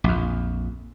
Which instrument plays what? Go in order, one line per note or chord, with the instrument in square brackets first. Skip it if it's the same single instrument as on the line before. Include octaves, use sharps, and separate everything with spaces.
[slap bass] A#1 F2